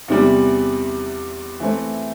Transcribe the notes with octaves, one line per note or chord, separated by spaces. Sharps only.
E2 C3 E3 G3
E3 A3 C4